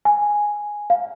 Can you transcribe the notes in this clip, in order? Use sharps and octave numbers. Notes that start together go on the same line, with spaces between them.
G#5
F5